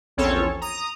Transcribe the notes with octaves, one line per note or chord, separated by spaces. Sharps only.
A#1 E2 C4 C#4 A4 C#5
A#5 D#6